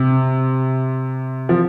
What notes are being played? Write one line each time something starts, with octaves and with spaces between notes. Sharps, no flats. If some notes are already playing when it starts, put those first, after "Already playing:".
Already playing: C3
F3